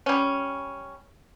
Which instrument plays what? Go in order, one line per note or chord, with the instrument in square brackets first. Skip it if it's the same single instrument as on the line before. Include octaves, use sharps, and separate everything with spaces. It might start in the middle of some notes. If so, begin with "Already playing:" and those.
[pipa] G3 C#4